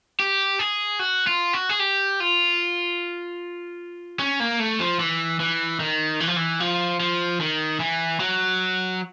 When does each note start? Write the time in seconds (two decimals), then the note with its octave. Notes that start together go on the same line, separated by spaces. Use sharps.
0.20 G4
0.59 G#4
0.99 F#4
1.27 F4
1.53 F#4
1.69 G#4
1.79 G4
2.20 F4
4.19 C#4
4.40 A#3
4.59 A3
4.80 F3
5.00 E3
5.40 E3
5.80 D#3
6.20 E3
6.28 F3
6.36 E3
6.60 F3
7.00 F3
7.40 D#3
7.80 E3
8.20 F#3